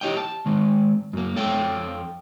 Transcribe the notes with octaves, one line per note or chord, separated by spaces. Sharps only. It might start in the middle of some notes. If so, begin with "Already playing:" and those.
E4 G4 C#5 D#5 G5
A5
D#3 G#3
F#2 A#3
F2 A4 C#5 G5